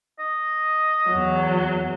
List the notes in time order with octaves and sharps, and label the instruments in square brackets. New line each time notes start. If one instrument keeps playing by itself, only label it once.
[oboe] D#5
[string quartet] E2 F#3